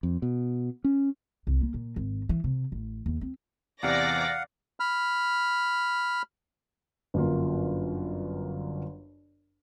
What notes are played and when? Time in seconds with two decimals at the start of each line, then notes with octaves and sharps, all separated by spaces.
0.03 F2
0.22 B2
0.84 C#4
1.47 C2
1.61 A#3
1.74 A#2
1.96 G#1
2.29 E3
2.44 C3
2.72 A1
3.06 D#2
3.21 C4
3.83 E2 C3 E3 D5 F5 F#5 A#6
4.80 B5 F6
7.14 G1 F#2 A#3 F4